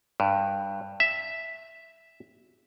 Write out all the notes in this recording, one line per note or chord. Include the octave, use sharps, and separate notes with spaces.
G2
E5